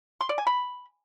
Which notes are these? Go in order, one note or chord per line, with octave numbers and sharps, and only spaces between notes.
C6
D5
G#5
B5